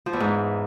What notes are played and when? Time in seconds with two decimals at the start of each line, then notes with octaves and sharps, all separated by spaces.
0.06 F3
0.13 E2
0.20 G#2